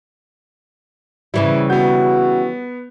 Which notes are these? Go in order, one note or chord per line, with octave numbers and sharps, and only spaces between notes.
C#3 E3 G3 E4
B3 F#4 G6